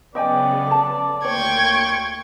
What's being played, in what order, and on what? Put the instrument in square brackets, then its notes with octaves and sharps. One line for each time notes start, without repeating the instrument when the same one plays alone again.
[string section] C#3 F#3 B3 [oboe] D5 [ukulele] D#5 G5 G#5
[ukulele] A4 A5
[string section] D2 A#3 C6 [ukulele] C#5 [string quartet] G5 C#6 G#6